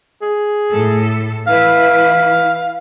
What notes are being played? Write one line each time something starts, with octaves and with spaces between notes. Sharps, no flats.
G#4
A2 A4
E3 E4 B4 F5